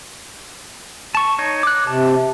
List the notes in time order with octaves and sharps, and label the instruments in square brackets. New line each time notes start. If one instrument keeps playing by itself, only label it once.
[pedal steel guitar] A5 C#6
D#4 C#5
D6 F#6
[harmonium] C3 [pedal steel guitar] A5